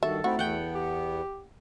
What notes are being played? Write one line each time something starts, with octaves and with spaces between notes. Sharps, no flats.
G2 D#3 F#4 A4 E5
A3 C4 D#4 E4 F#4
E2 B3 F#5 G5
G4